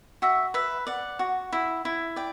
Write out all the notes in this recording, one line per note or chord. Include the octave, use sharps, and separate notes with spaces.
F#4 E5
B4 E5
D5 F#5
F#4
E4
E4
D5 G5